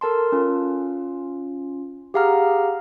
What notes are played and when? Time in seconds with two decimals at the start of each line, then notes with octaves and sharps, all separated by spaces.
0.01 A4 A#4 A5 C6
0.32 C#4 F4
2.14 G4 G#4 F5 F#5 A#5 F6